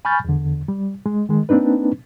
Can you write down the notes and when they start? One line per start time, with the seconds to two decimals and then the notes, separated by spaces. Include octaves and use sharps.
0.05 G#5 B5 C#6 F6 G6 A6
0.25 E2 D3
0.68 G3
1.06 G#3
1.29 D#3 G#3
1.49 A#3 C4 D4 D#4 B4